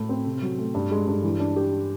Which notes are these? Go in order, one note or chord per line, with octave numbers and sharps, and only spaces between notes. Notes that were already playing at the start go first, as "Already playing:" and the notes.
Already playing: A2 A3
C4
C3
F#3
A3
G2
G#3
G2
E3
D4
G4